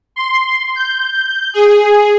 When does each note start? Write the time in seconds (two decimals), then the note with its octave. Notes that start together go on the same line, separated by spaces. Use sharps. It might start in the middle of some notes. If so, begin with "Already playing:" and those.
0.16 C6
0.76 G6
1.54 G#4